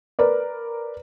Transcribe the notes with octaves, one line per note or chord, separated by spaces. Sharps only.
A#4 B4 D5